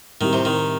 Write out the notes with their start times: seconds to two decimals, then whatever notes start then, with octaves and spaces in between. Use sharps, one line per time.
0.21 A2 D#3 G3 C4 E4 G4
0.33 C3
0.45 D#3